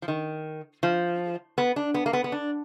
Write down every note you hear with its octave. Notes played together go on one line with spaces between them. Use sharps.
F3
D#3
F3
B3
D4
B3
A#3
B3
B3
D4